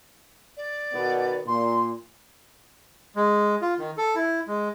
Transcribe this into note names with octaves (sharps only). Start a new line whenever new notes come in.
D5
B2 D#3 B3
A#2 C6
G#3
F4
D#3
A4
E4
G#3